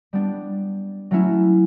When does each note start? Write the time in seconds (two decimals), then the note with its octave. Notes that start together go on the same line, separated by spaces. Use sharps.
0.13 G3 B3 D4
1.11 F#3 A3 C#4 E4